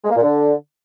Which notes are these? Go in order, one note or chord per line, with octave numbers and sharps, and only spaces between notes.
G#3
A#3
A#2
D3